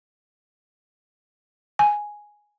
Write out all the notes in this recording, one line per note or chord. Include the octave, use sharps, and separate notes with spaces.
G#5